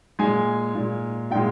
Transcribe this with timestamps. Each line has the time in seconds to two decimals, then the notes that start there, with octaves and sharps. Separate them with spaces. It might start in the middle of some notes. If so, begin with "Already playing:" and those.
0.19 A#2 G#3 G#5
0.74 A#2 G#3
1.30 A#2 G#3 G5